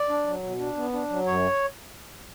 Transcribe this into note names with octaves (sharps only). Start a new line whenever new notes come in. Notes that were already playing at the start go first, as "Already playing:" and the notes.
Already playing: D5
D4
F#3
B2
D4
B3
D4
F#3
F#2 C#5